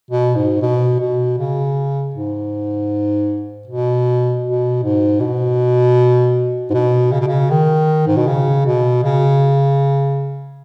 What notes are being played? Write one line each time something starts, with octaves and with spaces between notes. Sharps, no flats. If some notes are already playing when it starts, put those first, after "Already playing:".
B2
G#2
B2
B2
C#3
G#2
B2
B2
G#2
B2
G#2
B2
C#3
B2
C#3
D#3
G#2
B2
C#3
B2
C#3